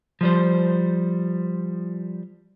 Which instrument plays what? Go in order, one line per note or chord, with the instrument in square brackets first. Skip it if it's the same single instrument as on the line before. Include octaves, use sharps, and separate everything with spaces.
[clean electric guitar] F3 G3 C5